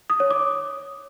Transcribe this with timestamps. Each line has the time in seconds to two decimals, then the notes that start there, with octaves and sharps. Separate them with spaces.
0.10 D#6
0.20 C#5
0.31 D6